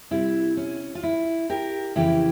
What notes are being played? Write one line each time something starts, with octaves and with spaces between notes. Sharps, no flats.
C3 G3 C4 E4
C#4
F4
E4
G4 A#4
F2 C#3 E3 A#3 E4 G4